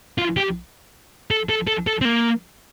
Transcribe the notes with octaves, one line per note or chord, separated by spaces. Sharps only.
F4
G4
A4
A4
A4
A4
C4
A#3